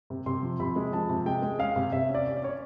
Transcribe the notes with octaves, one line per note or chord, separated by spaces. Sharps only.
C3
C3 C6
F3
C3 B5
G#3
F3 A5
C3
G#3 G5
G#3
C#4 F5
C3
C3 E5
C#4
D5
C#4
D5
C#4 C#5